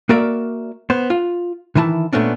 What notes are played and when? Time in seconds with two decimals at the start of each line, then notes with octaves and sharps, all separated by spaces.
0.09 A#3 F#4 A#4 D5 E5
0.90 B3 C5
1.10 F4
1.75 D#3 E3 E4 A5
2.13 A#2 A3 B3 C#4 D4